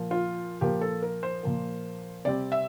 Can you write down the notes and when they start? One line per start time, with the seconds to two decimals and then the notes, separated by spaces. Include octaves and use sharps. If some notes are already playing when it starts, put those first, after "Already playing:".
Already playing: A#2 F3 A#3
0.11 F4
0.61 A#2 F3 A#3 G4
0.81 A4
1.02 A#4
1.23 C5
1.43 A#2 F3 A#3
2.25 C3 G3 C4 D5
2.52 E5